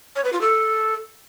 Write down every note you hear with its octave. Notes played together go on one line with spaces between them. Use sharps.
C#5
B4
F4
A4